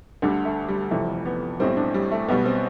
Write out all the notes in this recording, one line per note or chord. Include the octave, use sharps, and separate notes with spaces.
D2 D3 G3 D4
A3
G3
F1 F2 E3 G3 A3
B3
B1 A2 G3 C4
D4
G3
A3
B1 B2 G3 B3
C4